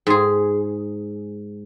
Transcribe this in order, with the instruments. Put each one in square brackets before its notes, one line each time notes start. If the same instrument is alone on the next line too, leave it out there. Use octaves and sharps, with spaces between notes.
[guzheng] G#2 G#4